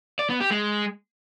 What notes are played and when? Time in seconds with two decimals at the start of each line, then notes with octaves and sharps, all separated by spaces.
0.19 D5
0.30 B3
0.40 G4
0.51 G#3